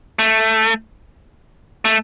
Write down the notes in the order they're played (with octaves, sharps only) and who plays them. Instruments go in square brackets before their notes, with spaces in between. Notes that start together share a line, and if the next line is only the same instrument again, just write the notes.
[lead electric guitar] A3
A3